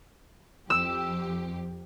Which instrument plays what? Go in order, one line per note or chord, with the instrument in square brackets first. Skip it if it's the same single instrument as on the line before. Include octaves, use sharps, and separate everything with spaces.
[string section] F2 G4 [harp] E6